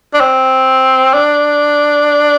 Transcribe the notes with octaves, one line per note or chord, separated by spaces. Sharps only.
D4
C4
D4